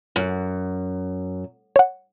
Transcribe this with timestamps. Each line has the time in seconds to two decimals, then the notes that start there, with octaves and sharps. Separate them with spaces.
0.16 F#2
1.76 C#5 F#5